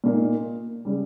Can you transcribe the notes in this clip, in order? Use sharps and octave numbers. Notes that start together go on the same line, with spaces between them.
A#2 A#3 D#4
C#3 G3